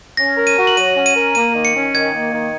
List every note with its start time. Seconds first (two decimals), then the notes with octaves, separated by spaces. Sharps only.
0.17 C#4 A#6
0.37 A#4
0.47 D#7
0.57 F#4
0.67 F#7
0.77 F#3 D#7
0.96 C#4
1.06 D#7
1.15 A#4
1.35 A#3 D#7
1.55 D#3
1.65 C#7
1.75 C#4
1.95 D#3 G#6
2.14 A#3
2.33 D#3